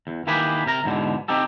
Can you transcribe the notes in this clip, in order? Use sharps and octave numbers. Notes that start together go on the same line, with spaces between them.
E2
D#3 E3 A#3 G4 G#4 B4
C3 A#4 A#5
E2 G#2 B2 D3
C4 D#4 G4 A4